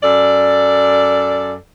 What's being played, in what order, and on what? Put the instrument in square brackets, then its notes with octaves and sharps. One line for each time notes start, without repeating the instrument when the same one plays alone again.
[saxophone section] F#2 A4 D5